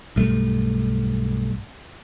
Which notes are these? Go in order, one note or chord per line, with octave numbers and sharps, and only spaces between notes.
B1 G2 A3